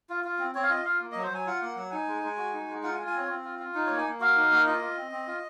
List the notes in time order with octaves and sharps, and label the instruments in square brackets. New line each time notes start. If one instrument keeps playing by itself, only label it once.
[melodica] F4
F4
C4
C4 C#5
F5
F4 D#5
F4 F5
A#3
F#3 D#5
C5
F#3 G#5
F4 F#5
A#3 F#5
F#3 F#5
D#4 G#5
G#3
G#3
F#4
D#4
G#3
F4 F#5
G#5
F4
G#5
C4 C#5
C4
F4
F4
D#4
A#3 C#5
G#5
A#3
F#4 F5
D#4
A#3
F4 D#5
F4
C4
C4
F4